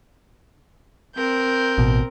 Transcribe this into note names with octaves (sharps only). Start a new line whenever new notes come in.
C4 A#4 G6
A1 B2